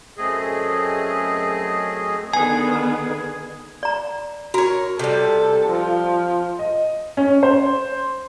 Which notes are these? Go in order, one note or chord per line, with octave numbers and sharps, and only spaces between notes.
F#2 A3 C4 G#4 D#5
D3 D#3 B3 G#4 B4 G#5
D5 A#5
F#4 A#4 C#5
C3 G3 A4
F3
D#5
C#4
C5